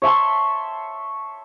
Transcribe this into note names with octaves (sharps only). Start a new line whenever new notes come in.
C#5 E5 A5 C6